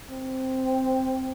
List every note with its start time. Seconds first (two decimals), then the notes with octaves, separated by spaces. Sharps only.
0.10 C4